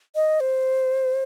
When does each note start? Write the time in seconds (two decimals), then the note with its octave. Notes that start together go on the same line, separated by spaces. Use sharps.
0.15 D#5
0.40 C5